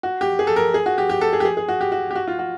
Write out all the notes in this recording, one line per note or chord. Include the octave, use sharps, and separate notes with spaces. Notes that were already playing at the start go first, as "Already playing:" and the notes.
F#4
G4
G#4
A4
A#4
G#4
F#4
G4
G4
A4
G#4
G4
G#4
G#4
F#4
G4
F#4
G4
F#4
F4
F#4